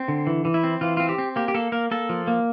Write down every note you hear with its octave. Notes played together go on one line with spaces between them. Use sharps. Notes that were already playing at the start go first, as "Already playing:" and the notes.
Already playing: C4
D3
E3
E3
E4
C4
E3 F4
C4 F4
G4
C4
A#3 G4
G4
A#3 A4
A#3 A#4
A#3 A4
F3
A#3